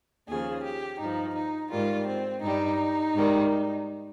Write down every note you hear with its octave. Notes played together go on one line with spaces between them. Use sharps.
D#2 C#3 F3 G#4
G4
G2 F3 D#4
D#4
G#2 D#3 G3 F4
C4
G2 G3 D#4
G#2 D#3 G3